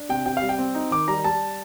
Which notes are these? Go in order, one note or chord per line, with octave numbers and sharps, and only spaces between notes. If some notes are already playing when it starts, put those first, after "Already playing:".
Already playing: D4
C3 G5
C3 G5
F5
G3
G5
C4
D#4
D#3 D6
G3 A#5
G3 A5